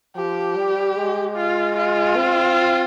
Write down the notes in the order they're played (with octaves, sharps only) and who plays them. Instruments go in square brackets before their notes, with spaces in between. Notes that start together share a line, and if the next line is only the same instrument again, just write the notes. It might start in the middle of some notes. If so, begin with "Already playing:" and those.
[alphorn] F3 [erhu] G4
[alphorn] G3
G#3
[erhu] F4
F4
[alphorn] C4